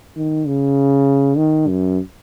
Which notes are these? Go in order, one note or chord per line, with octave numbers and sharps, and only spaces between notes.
D#3
C#3
D#3
F#2